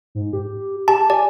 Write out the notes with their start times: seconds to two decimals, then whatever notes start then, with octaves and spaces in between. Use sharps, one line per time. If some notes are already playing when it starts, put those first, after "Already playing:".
0.15 G#2
0.33 G4
0.88 G4 A5
1.10 D5 G#5